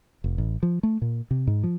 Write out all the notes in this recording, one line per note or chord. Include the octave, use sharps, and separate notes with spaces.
F1
A1
F3
A3
A#2
C3
G#2
F3